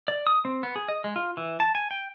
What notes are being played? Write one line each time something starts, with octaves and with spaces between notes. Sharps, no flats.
D5
D#6
C4
B3
G#4
D#5
G#3
F4
E3
A5
G#5
G5